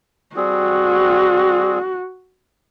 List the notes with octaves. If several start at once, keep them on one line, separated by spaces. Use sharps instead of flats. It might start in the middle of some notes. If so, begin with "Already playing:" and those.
G3 C4 F#4 G#4